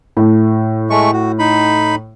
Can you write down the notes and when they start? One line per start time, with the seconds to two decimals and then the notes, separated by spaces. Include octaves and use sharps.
0.17 A2
0.90 G#3 A3 C#6
1.13 F#4
1.39 D#4 B5